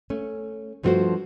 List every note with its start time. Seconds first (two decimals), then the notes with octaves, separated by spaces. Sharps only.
0.10 A3 C#4
0.83 G2 F3 A3 F4 F#4 C5